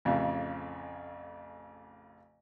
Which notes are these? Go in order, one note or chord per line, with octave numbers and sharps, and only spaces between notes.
A1 F2 C#3